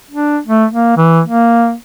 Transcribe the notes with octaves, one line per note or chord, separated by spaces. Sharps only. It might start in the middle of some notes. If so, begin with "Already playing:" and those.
D4
A3
A#3
E3
A#3